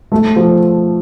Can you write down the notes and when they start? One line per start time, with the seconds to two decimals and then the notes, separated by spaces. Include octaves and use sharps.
0.12 A3
0.36 F3